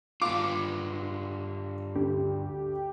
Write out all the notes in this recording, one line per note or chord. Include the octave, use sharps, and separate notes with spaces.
G2 F4 F5 C6 D6
D2 G4